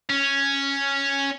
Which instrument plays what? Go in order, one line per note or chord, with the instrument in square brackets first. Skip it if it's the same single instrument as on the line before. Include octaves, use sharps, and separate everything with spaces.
[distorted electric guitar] C#4